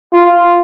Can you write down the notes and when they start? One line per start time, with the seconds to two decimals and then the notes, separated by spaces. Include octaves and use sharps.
0.13 F4